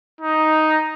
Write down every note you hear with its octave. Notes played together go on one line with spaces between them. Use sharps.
D#4